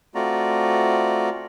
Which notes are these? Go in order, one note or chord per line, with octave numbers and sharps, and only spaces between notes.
A3 C4 F4 F#4 D5 A#5